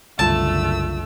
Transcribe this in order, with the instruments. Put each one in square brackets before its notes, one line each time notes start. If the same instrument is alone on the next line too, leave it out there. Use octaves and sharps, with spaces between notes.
[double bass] F#1 D3 [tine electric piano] C2 F4 [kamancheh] A3 E6 [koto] A5